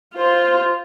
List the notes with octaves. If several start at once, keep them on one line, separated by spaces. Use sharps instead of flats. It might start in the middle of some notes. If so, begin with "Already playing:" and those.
F4 C5